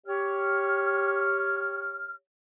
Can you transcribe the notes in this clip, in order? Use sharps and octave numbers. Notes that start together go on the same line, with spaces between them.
G4 C#5 F6